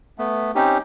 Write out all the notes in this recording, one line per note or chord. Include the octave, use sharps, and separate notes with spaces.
A3 B3
C4 C#4 D#4 G4